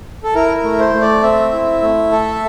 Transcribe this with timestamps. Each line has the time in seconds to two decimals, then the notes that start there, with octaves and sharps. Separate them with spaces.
0.23 A4
0.35 E4 A#4
0.57 A#4
0.64 A3
0.79 C5
0.94 A3
1.01 D5
1.23 C4 E5
1.52 E4
1.82 A3
2.12 A4